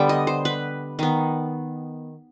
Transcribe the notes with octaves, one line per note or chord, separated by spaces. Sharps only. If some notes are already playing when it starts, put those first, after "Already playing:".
Already playing: D3 G3 B3 G5
D#5
C5
B4
D#3 B3